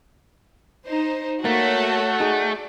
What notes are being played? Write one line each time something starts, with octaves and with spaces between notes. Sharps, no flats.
D#4 C5
A3 A#3 F#4 A4 C#5 F#5
D#4 G#4 D5